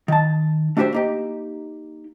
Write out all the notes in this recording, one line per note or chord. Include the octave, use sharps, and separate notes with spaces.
D#3 A5
A3 D4 F#4 G4 C5 E5
A#3 D#4 G4